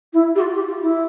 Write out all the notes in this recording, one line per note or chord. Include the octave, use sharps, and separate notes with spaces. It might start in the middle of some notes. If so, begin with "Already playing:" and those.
E4
G4
F4
G4
F4
E4